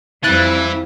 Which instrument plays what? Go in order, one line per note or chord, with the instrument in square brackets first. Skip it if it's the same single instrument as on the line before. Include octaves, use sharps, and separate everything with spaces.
[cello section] F2 G3 C4 [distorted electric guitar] E3 [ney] E4 [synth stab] F#6 A6